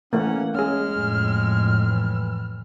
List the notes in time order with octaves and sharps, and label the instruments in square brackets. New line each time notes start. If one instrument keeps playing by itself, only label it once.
[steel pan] E3 A3 A#3 [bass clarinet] C#4 [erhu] F#5
[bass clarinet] G#3 [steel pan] C#4 G#4 [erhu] F6
[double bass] F2 A2
[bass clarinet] E3